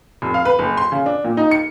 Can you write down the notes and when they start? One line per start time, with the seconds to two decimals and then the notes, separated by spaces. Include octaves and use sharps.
0.22 F1
0.34 F5
0.45 B4
0.59 F#1
0.77 C6
0.92 C#3
1.06 D4
1.24 A#2
1.37 D#4
1.51 C#7